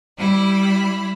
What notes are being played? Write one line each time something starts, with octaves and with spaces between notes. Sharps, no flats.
G3 E4 B5